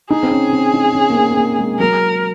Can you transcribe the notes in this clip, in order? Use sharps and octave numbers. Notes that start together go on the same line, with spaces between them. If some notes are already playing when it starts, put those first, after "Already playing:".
D#4 G#4
C4
C#4
C4
D#4
C#4
A#3
C4
C4
A#3
G#3
F#3 A#4